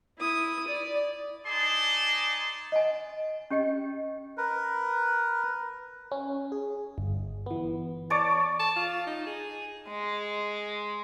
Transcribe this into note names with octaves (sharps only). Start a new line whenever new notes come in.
E4 D#6
D5
D#4 G#4 D5 A5 C6
D#5 F#5 G#5
C#4 G4 D#5 G5
A#4 B4
C#4
G#4
G1
E3 B3
C#5 D5 A5
A5
F4
D#4
G#4
G#3